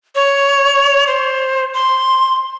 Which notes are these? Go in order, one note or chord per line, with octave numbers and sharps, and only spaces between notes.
C#5
C5
C6